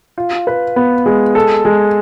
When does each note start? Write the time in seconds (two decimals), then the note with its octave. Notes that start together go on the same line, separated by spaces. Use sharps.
0.18 F4
0.47 B4
0.76 B3
1.06 G#3
1.35 A4
1.65 G#3